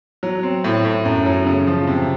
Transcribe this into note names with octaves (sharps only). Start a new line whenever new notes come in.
F#3
C4
A2
A2
F#2
F#3
C#3
F3
C3